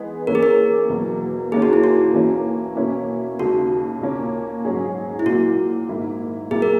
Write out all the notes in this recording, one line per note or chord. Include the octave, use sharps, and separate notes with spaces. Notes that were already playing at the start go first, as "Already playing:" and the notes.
Already playing: E3 G#3 B3 D#4 G#4
E3 A#3 C#4 A#4
G#4
A#4
E2 B2 F#3 A#3
D#2 D#3 A#3 C#4 G#4
F#4
E4
F#4
E3 A#3 C#4 E4
B2 A#3 C#4 E4
D#2 C#3 G#3 F#4
A#2 A#3 C#4
G#2 F#3 C#4 G#4
E4
A#2 F#3 A#3 F#4
G#2 D#3 A#3 E4
A#2 F#3 A#3 E4 G#4
A#4